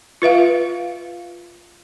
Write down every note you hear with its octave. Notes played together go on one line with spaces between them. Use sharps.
F4 B4 E5 F5